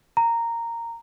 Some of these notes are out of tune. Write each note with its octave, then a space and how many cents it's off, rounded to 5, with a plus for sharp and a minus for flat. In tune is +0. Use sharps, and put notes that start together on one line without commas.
A#5 -10